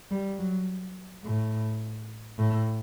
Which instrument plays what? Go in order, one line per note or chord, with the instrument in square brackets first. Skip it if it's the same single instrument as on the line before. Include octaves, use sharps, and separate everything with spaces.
[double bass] G3
F#3
A2
A2